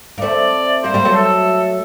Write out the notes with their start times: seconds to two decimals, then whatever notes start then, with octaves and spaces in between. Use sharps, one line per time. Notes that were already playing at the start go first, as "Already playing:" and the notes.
0.18 A#3
0.21 A3 C4 D5
0.83 G3 A#3 C5
0.94 G3 A#3
1.05 F#3 A3
1.14 A4